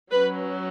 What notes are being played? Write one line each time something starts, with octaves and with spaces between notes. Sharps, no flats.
F#3 C#4 B4